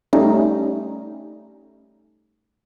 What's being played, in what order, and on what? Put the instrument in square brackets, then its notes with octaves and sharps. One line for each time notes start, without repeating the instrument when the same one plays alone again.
[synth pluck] G3 A3 C#4 D#4